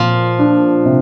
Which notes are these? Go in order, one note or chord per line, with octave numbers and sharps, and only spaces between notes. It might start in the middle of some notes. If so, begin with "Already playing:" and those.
Already playing: A#2 F3 C4
D4
C3